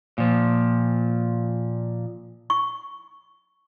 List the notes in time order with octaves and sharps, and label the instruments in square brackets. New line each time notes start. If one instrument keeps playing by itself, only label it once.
[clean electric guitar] A#2 F3
[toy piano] C#6